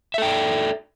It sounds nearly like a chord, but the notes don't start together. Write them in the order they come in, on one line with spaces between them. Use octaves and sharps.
E5 A4 G5 D5